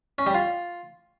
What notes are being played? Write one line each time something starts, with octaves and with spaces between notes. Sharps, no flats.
C#4
G3
F4